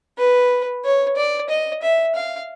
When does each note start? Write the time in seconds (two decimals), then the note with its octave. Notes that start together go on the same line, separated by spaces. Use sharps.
0.18 B4
0.84 C#5
1.17 D5
1.49 D#5
1.82 E5
2.15 F5